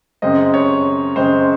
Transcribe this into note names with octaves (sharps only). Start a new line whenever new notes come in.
F#2 C#3 G#3 C4 D#5
C#5
F#2 C#3 G#3 C4 C5